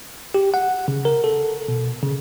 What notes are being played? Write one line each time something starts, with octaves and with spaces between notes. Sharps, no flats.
G4
F#5
C#3
A#4
A4
B2
C#3